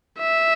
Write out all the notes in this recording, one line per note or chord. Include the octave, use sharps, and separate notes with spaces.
E5